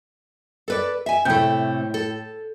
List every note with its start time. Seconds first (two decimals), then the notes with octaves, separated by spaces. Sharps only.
0.68 A4 B4 D5
1.06 E5 G#5
1.25 A2 C3 A3 G5 G6
1.94 A4